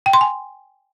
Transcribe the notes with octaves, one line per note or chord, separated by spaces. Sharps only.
G5
C6
G#5